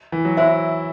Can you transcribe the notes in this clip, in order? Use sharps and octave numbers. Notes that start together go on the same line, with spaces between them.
E3
F#3
E4 F#4 C5 E5